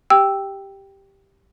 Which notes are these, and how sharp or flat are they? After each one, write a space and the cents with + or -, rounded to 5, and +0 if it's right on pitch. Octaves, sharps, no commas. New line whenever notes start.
G4 +0 G5 +0 E6 +0